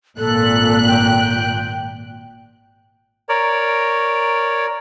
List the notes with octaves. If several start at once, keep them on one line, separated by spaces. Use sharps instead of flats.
G#1 A#2 A4 F#6
G5
A#4 C#5 D5